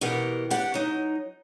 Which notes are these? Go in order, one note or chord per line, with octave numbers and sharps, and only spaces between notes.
B2 E3 G4 A#4 F#5
D4 G4 F#5
F#3 D#4